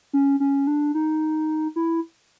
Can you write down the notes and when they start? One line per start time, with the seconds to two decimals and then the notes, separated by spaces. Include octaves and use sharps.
0.13 C#4
0.40 C#4
0.67 D4
0.94 D#4
1.76 E4